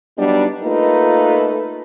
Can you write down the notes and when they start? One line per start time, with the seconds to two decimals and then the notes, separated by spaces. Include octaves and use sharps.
0.18 F#3 G3 B3 D4 D#4
0.63 A3 A#3 D#4 F4 A4 B4